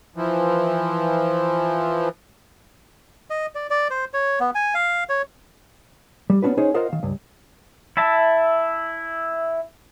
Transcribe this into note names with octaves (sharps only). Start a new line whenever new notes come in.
E3 F3
D#5
D5
D5
C5
C#5
B3
G#5
F5
C#5
G3
B3 C#4 D4 F#4 B4
C#4 D#4 G#4 C5 C#5
F4 A#4 C5 D#5 F5 F#5
D#3 F5
C#2 G2
E4 E5 A5